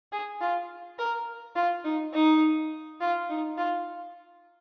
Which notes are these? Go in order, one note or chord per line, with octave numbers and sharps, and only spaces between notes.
G#4
F4
A#4
F4
D#4
D#4
F4
D#4
F4